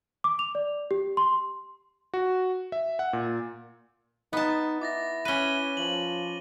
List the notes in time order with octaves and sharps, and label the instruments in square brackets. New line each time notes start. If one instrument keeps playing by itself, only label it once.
[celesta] D6
F7
D5
G4
C6
[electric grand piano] F#4
E5
F#5
A#2
[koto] B3 A5 [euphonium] D#4
[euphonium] E4 [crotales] D6 A6 A#6
[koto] C#4 B4 [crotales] D#7 G7
[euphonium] F3 [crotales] F#7